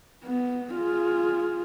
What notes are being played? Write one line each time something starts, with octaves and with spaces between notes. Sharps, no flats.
B3
F4 G#4